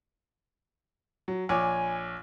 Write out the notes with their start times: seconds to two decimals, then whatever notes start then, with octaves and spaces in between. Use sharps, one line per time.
1.28 F#3
1.49 A#1 C#5 G#5 D6